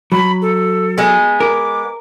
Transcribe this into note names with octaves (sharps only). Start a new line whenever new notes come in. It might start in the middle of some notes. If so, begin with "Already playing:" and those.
F#3 B5
A4
G#3 B3
A#4 D6